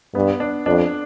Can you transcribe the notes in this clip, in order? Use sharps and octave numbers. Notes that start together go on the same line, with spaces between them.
G2 B3
D4
F2 D4